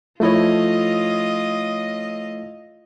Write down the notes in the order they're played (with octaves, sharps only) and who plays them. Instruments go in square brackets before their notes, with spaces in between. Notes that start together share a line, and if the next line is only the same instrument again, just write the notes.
[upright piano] F3 A4 C#5 [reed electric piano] A3 E4 [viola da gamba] F4 D#5